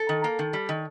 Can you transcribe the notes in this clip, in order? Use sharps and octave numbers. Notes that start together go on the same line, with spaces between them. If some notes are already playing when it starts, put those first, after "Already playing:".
Already playing: A4
D#3
A#3
D#3
G3
D#3